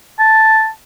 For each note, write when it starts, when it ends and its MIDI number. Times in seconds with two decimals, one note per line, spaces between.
0.19 0.68 81